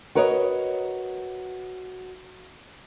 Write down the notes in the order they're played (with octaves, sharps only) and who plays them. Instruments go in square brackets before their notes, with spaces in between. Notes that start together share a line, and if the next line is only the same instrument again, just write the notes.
[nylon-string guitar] F#4 A#4 B4 C#5 D#5